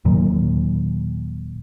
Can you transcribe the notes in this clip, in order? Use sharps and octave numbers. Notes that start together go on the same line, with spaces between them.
D#1 D#2 A#2 F#3